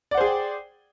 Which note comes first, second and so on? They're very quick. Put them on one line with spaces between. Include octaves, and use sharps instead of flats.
D5 F#5 C5 G#4 G5